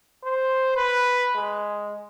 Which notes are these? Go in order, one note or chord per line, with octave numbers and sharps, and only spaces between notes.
C5
B4
G#3